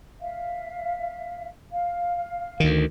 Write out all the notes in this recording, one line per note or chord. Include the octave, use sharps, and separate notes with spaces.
E5 F5
F5
D2 D#3